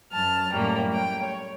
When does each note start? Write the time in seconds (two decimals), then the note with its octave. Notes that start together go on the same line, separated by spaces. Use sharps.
0.12 F#2 A5 F6
0.52 F#2 A2 G3 A#3
0.92 G5
1.23 C#5